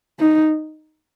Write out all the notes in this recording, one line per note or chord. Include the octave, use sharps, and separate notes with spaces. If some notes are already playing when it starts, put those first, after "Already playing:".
D#4